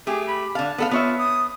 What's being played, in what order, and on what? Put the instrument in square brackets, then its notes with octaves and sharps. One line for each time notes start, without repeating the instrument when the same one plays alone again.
[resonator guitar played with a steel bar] A3 G4 [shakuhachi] G#4
[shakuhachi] B5
[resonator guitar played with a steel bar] D3 F5 [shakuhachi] A5
[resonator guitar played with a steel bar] B3 A4 F5
[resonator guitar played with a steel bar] B3 C#5 E5 [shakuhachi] F4
[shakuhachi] D#6